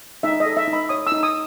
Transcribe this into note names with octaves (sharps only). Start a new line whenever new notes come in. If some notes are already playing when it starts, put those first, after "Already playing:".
D#4 E5
D#5
A4
E5
D#4
B5
C#5 D#6
E6
D#4
D#6